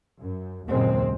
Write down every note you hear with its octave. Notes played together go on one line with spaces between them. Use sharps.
F#2
F#1 D#2 A#2 G#3 C4